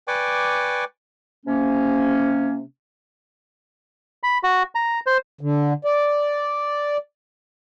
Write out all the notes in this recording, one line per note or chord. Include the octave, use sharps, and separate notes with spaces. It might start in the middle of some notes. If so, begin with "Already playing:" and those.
B4 D5 G5 G#5 C#6 D6
C3 A#3 C#4
B5
F#4
A#5
C5
D3
D5